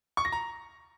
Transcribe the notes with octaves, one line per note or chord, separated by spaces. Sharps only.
C#6
A#6
A#5